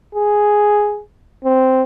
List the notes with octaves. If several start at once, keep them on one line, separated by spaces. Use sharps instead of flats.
G#4
C4